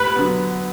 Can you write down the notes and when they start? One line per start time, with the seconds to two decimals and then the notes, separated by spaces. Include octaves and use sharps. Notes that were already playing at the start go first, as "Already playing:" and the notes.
Already playing: B4
0.15 D3 F#3 B3